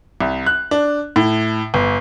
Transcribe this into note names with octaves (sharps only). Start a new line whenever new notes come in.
C2
F#6
D4
A2
G1